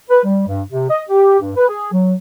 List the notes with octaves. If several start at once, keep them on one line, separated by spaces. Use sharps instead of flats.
B4
G3
G2
C3
D#5
G4
G2
B4
G#4
F#3